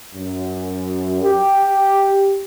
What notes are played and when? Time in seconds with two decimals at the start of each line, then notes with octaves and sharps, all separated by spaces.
0.15 F#2
1.23 G4